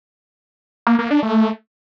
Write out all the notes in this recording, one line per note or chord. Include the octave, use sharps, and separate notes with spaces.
A#3
A#3
D4
A3